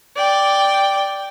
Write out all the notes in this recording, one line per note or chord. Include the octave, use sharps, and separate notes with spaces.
D5 G5